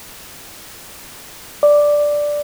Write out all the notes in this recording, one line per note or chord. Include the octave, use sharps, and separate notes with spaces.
D5